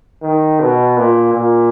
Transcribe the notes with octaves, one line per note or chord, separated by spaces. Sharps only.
D#3
B2
A#2
A#2